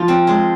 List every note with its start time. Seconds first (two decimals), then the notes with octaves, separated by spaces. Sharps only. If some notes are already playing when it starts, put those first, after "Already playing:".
Already playing: F3 F4
0.08 C4
0.27 G#3